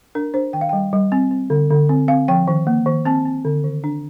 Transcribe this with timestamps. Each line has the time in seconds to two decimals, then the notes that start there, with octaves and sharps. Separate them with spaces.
0.15 D4 A#4
0.34 D4 C5
0.53 D#3 G5
0.61 F5
0.69 G3 G5
0.93 G3
1.12 C4
1.31 C4
1.50 D3
1.70 D3
1.89 C4
2.08 C4 F5
2.28 F3 G5
2.48 D#3
2.67 A#3
2.86 D#3
3.05 C4 A5
3.25 C4
3.45 D3
3.64 D#3
3.84 D4